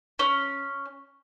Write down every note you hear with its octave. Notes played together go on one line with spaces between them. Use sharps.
C#4